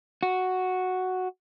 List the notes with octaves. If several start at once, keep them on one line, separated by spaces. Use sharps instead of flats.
F#4